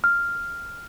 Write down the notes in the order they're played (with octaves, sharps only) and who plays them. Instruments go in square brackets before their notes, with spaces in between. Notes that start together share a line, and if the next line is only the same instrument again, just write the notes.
[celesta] F6